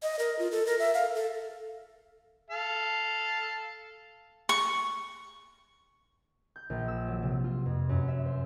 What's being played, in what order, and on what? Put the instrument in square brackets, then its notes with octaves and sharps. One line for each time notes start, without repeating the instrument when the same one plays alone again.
[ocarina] D#5
A#4
F4
A4
A#4
E5
F5
A4
[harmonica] A4 F5
[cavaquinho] C#6
[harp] G6
A#1
E6
F#3
C3
F4
F2
F#2
E5
C5